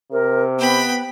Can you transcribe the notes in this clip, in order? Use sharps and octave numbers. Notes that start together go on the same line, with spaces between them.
C3 A#4
B3 G5 B5